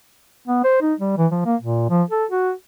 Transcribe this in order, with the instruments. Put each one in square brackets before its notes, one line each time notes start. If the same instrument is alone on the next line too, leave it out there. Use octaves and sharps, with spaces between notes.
[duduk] B3
C5
D#4
G3
E3
F3
A#3
A#2
F3
A4
F#4